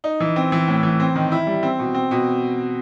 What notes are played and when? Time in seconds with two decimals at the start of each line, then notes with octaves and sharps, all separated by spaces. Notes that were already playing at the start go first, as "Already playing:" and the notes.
0.04 D#4
0.20 E3
0.36 C4
0.52 E3
0.67 A2
0.83 E3
1.00 C4
1.15 D#3
1.32 E4
1.47 G3
1.63 C4
1.79 B2
1.94 C4
2.11 B2